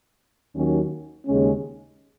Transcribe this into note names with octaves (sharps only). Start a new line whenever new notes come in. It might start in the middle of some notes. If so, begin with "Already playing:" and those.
D#2 D#3 F#3 C#4
D#2 C#3 G#3 C#4